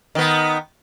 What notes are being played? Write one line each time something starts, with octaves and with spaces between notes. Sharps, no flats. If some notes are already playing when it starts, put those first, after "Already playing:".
D#3 B3